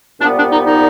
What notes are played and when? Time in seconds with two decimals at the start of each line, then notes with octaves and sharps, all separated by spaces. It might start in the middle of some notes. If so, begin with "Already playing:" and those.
0.20 C2 A#2 G3 B3 D4
0.37 D4
0.51 D#4
0.67 D#4